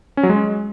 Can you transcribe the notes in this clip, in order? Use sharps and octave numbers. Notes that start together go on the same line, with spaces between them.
C#4
F#3
G#3